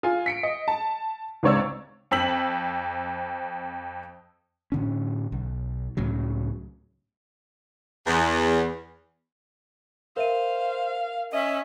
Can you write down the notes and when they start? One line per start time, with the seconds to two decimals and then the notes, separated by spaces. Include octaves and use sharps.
0.03 F4 G#5
0.26 B6 C#7 D7
0.43 D#5
0.68 A5
1.43 C#2 G#2 C4 C#5 D5 E6
2.11 F2 C4 E6 B6 F#7
4.72 A2 D3 C#4
5.32 B1
5.97 C#2 A2 C#3 F#3
8.06 E2
10.17 A#4 C5 E5 F5 D#7
11.33 C#4 D#5 E5